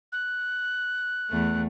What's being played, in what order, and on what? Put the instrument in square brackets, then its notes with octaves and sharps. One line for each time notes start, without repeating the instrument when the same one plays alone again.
[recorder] F#6
[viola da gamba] E2 A3